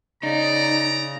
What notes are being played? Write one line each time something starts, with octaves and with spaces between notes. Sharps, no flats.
C#3 D#4 D5 A#5